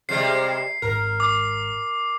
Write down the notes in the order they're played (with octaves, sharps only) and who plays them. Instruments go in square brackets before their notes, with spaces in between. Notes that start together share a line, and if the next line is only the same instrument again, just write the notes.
[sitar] C3 G3 G#3 [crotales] C7
[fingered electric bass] G#1 G#2 [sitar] A#4
[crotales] D6